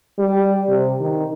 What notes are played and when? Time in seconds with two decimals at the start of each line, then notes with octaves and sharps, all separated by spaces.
0.19 G3
0.69 C3
1.00 D#3